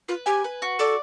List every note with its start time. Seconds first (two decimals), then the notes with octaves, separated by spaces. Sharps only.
0.08 F4 B4
0.26 G4 G#5
0.44 B4
0.62 F#4
0.79 A4 D5